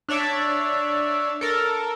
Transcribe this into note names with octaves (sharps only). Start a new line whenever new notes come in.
D4 C#5 D5 E5
A4 A#4